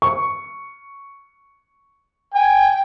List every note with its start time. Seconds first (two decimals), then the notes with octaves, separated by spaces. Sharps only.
0.02 C#6
2.34 G5 G#5